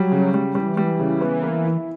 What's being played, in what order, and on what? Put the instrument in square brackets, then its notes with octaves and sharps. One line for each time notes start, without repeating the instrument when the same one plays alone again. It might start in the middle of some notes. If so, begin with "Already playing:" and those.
Already playing: [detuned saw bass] F#3 [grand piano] G3
[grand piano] C#3
G3
[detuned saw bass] E3 [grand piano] G3
[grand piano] G3
C#3
B3
A#3
E4